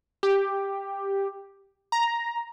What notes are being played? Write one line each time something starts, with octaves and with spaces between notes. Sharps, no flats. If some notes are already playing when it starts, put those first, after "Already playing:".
G4
A#5